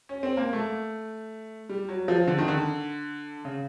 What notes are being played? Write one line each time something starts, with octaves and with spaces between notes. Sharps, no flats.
C#4
C4
A#3
A3
G3
F#3
F3
D3
D#3
D3
C#3